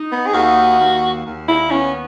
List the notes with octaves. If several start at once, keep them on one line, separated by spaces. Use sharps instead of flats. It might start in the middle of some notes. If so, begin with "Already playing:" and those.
Already playing: D#4
B3
G#4
D#2 F#4
D#2
D#2
E4
B3 C#4